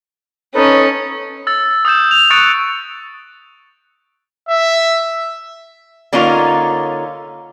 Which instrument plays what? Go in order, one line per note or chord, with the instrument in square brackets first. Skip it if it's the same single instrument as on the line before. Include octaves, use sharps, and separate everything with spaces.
[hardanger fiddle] C#4 [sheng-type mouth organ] D#4 A4 B4
[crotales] E6 A6
D#6 E6 G6 E7
F7
C#6 D#6 F#6 A6 C#7 D7
[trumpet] E5
[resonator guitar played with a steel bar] D3 A#3 C#4 D#4 F4 C#5